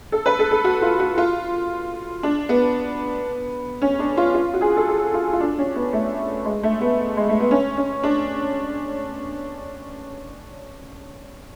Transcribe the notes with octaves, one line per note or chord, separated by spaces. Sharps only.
A4
B4
A4
A4
F#4
F4
F#4
F4
D4
B3
C#4
D4
F4
F4
F#4
G#4
A4
G#4
F4
F4
D4
C#4
B3
A3
G#3
A3
B3
G#3
A3
B3
C#4
C#4
D4